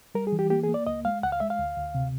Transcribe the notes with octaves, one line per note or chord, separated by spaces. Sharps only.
G3 A#4
G#4
E3
G4
A#3 G4
G#4
A#3
D5
C#2 D#5
G#3 F5
C#2 F#5
F5
G#3 E5
F5
D2
D2
C3